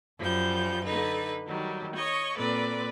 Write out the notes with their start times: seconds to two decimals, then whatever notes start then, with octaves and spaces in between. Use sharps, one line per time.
0.18 F#2 F3 G3 G6
0.84 D3 D#4 B4
1.46 D#3 F#3 G3
1.95 C#5 D#5 C#6
2.36 A#2 C4 A4 B4 D5